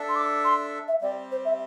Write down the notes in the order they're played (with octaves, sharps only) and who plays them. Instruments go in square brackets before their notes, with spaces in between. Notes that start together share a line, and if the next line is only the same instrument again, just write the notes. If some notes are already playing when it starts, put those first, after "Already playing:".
Already playing: [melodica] D4 A4 E5
[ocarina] C6
D6
C6
E5
[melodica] G3 C4 G4 [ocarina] D5
[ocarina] C5
E5